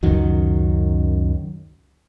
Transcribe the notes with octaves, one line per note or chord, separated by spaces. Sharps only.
C#2 F#2 D#3 F#3